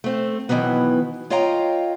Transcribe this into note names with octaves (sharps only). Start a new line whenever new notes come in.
A3 C4
B2 D#3 E3 F#3 B3
F4 C#5 D#5 F5 G5 A#5